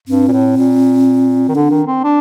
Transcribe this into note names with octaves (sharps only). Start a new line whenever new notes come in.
G2 C4
A#2
A2
A#2
D#3
D3 D4
D#3
C4
D4